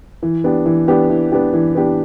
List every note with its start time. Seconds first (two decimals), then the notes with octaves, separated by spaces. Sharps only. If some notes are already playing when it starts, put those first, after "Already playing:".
0.23 E3
0.44 B3 D4 G4
0.66 E3
0.88 B3 D4 G4
1.10 E3
1.32 B3 D4 G4
1.53 E3
1.75 B3 D4 G4